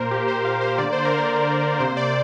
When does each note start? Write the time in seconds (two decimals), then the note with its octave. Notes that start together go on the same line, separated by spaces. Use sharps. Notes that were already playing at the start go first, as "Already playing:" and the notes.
Already playing: A#2 A#3 A#4 C5
0.11 G4
0.28 C5
0.45 F5
0.61 C5
0.78 D3 D5
0.83 A#3
0.93 C5
1.05 A#4
1.18 C5
1.80 C3 A#3 C5
1.97 D5